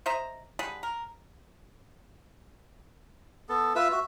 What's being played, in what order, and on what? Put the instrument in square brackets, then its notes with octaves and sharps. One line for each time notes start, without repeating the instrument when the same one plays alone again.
[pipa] C5 D#5 E5 A#5
D3 G3 G#4 B4
A#4
[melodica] B3 A4
F4 B4 E5 E6
F#4 E5